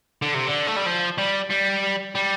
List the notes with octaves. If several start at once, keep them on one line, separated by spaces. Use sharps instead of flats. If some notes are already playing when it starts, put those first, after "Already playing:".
D3
C3
D3
A3
G3
F3
G3
G3
G3